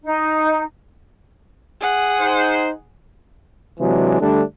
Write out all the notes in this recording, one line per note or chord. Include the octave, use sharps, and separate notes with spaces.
D#4
G#4 F#5
D#4 C5
C3 E3 F#3 G#3 D4
D3 G3 A3 D4